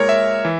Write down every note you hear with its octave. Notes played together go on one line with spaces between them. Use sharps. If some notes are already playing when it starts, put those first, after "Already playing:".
Already playing: A#2 G#3 A#4 C#5
E5
E3